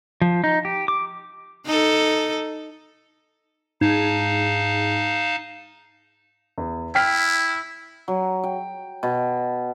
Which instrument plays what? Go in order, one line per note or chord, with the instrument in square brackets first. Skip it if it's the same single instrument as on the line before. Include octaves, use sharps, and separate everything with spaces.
[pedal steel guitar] F3
D#4
G4
D6
[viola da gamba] D#4 A4
[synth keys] G#2 [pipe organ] D#4 F5 A5
[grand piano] E2
[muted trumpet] E4 [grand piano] G5 F6 B6
[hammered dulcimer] F#3
G5
B2